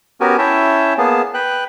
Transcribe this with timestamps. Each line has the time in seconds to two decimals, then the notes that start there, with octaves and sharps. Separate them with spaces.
0.21 B3 C#4 F#4 G4 A#4 G#5
0.38 C#4 E4 C#5 E5 G5 A5
0.98 A#3 B3 G#4 A5
1.34 B4 G5 F#6